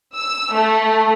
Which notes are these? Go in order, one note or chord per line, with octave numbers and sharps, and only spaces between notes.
E6
A3